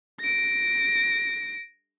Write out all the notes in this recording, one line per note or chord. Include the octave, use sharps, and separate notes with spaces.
A#6 D7